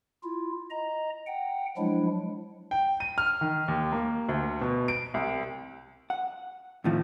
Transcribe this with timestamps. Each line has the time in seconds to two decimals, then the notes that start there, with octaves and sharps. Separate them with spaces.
0.24 E4 F4
0.70 D#5 A#5
1.27 F#5 G5
1.77 F3 F#3 G#3 D4 E4
2.71 G5
3.00 D#7
3.18 F6
3.41 D#3
3.68 D#2
3.92 A#3
4.29 D2
4.61 B2
4.88 D7
5.14 C2
6.10 F#5
6.84 F2 A2 D#3 F3 C4 A#6